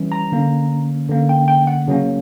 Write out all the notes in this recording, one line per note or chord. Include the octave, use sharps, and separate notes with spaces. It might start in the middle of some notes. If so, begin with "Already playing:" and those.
Already playing: E3 G3 C#4
A#5
D3 A#3 C#4
D3 A#3 C#4
G5
G5
F#5
C#3 F#3 A#3 C#4